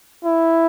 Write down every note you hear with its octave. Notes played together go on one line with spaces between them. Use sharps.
E4